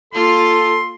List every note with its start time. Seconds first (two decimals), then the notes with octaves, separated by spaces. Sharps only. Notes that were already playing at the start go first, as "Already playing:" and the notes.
0.13 A#3 F4 A4 C6